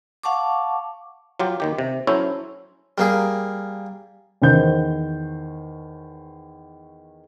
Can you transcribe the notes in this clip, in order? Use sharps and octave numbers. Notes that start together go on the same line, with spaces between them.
F5 F#5 A5 C#6 D6
F#3 F4 G4
D#2 D#3 G4
C3
F#3 C#4 E4 A4 C5 C#5
G3 A#3 G#4
E2 D#3 C5 G6